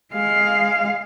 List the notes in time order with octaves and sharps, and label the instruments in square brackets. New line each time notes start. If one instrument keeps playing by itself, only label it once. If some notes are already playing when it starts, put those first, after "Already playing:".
[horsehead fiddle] G#3 F5